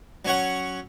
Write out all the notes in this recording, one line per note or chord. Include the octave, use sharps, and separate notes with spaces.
F#3 C#4 C#5 F#5